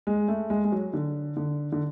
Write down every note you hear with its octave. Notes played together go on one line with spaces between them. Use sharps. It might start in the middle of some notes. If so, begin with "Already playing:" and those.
G#3
A3
G#3
G#3
F#3
D3
D3
D3